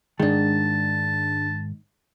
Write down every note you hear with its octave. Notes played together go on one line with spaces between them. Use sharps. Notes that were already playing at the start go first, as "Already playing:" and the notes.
G#2 D#3 G#3 D4 A5